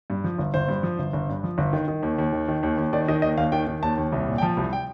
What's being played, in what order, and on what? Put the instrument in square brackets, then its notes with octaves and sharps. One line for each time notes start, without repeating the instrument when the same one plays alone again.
[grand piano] G2
F3
G1
G1 C5
G2
F3
G1
G1
G2
F3
G1
D#3
D#3
D#2
D#2
D#3
D#3
D#2
D#2
D#3 D5
D#3 D#5
D#2 D#5
D#2 F5
D#3 G5
D#3
D#2 A5
D#2
C2
A#2
G5
F3 A5
C2
G5